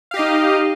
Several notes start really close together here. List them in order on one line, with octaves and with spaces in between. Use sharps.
F5 G4 D#5 D#4